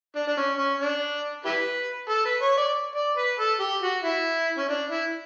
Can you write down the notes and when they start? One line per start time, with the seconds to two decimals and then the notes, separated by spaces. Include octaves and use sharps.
0.15 D4
0.27 D4
0.37 C#4
0.58 C#4
0.80 D4
1.45 E4 G4 B4
2.09 A4
2.25 B4
2.42 C#5
2.58 D5
2.96 D5
3.17 B4
3.39 A4
3.60 G4
3.82 F#4
4.04 E4
4.58 C#4
4.68 D4
4.90 E4